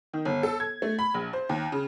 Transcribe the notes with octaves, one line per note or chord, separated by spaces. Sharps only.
D#3
G1
A4
G#6
A3
B5
A#1
C5
D#2
C#3